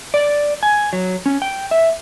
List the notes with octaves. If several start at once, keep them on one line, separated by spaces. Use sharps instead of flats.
D5
G#5
F#3
C#4
G5
E5